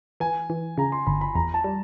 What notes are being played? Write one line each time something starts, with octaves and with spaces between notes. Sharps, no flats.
E3 G#5
E3
C#3 A#5
C6
G1 B5
B5
E2 A#5
A5
G3